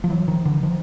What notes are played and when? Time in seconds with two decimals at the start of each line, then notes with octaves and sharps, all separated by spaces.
0.04 F3
0.10 E3 F#3
0.28 D#3 F3
0.45 D3 E3
0.63 D#3 F3